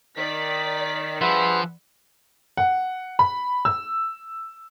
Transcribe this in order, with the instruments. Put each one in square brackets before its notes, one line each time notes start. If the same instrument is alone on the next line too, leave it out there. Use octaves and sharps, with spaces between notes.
[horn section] D#3 [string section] D5 B6
[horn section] G2 G#4 E5 [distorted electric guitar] F3 [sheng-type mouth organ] B4 F#5 C6
[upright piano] F#5
B5
E6